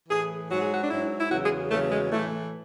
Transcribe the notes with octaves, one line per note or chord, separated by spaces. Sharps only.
A2 E3 G#4
G#2 F#3 F#4
G#4
F#4
D4
G#2 F#3 E4
E4
E2 C#3 F#3 F#4
G#4
E2 C#3 F#3 A3
G#3
A2 E3 A3